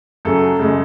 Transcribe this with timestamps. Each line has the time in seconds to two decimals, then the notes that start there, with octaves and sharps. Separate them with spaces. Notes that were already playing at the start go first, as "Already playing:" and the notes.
0.25 F#2 C#3 F#3 A4
0.59 F#2 C#3 G#3